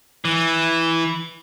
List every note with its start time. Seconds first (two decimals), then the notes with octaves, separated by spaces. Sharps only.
0.25 E3